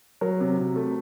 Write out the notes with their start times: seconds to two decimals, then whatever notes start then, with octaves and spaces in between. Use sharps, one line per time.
0.21 F#3 F#4 A#4
0.40 C3
0.59 C3
0.76 A3